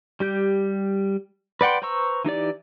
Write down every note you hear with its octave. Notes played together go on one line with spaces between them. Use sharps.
G3 G4 G6
B4 D5 F#5 G5 C6
B4 C5 A#5 C#6 E6
E3 D#4 G4 D5